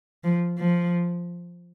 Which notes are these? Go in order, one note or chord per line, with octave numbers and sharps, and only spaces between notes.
F3
F3